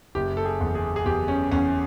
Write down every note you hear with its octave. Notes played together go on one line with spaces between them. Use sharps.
F#1 G4
A4
G#4
E2
G#4
G#4
E2 G4
C#4
E2 C#4